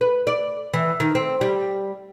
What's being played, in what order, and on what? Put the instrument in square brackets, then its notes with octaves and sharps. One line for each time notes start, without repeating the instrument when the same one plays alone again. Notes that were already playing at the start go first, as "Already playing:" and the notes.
[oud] B4
D5
E3
D#3
C4
G3